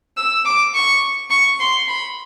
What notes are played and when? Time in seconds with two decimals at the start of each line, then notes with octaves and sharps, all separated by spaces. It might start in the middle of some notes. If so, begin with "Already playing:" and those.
0.17 E6
0.45 D6
0.74 C#6
1.30 C#6
1.60 C6
1.88 B5